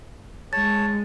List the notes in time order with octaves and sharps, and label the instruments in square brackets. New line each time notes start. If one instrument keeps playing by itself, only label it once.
[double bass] G#3 [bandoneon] C#5 A5 [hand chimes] A6